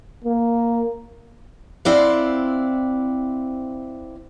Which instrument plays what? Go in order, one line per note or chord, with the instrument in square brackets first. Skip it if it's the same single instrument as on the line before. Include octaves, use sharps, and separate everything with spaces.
[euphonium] A#3
[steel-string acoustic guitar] C4 E4 C5 D5 F5 F#5